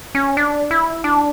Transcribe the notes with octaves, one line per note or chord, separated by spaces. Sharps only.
C#4
D4
E4
D4